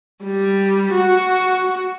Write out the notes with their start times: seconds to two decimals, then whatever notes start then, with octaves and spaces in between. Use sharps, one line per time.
0.23 G3
0.93 F#4